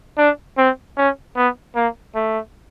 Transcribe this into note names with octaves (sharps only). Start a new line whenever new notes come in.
D4
C4
C#4
B3
A#3
A3